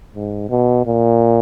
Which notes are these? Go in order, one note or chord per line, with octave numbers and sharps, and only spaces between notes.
G#2
B2
A#2